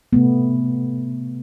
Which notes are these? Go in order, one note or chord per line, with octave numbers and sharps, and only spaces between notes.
C3 A3 B3